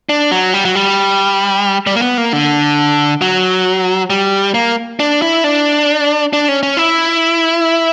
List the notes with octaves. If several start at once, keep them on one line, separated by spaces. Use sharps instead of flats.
D4
F#3
G3
F#3
G3
G3
A#3
B3
A#3
D3
F#3
G3
A#3
D4
E4
D4
D4
C#4
C#4
E4